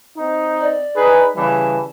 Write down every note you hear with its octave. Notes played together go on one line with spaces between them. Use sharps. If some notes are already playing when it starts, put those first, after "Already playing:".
C4 D#4
D5
D#4 G#4 B4
C#3 E3 G3 A5